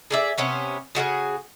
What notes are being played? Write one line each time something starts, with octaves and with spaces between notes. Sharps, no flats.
G#4 D5 E5
C3 B3 C#4
C#3 F#3 F#4 G#4